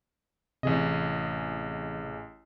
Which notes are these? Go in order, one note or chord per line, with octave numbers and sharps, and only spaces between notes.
A1 C3 E3 G#4 D#5